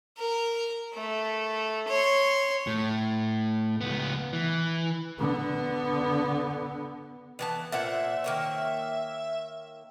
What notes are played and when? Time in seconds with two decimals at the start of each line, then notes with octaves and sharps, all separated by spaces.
0.18 A#4
0.94 A3
1.88 C#5 C6
2.67 A2
3.81 C#2 B3
4.33 E3
5.19 D3 B3
7.39 E3 B3 A5
7.72 A#2 C5 E5 F#5
8.24 D#3 A#3 C#5